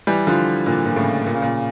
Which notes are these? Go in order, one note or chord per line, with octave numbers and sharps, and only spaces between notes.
E3 G3
D3 F3
A#2 D3
A#2
A2 C#3
A#2
C#3
A#2